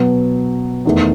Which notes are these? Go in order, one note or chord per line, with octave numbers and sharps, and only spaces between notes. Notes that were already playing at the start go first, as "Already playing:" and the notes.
Already playing: B2 F#3 B3
E2 D#3 A3